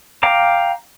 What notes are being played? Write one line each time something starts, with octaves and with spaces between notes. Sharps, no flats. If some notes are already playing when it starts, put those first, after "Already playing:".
F5 G5 A#5 D6